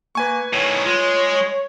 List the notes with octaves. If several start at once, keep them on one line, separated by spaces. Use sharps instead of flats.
A#3 B4 G#5 C#6
A2 D#3 C#5
G#3 F4 C#5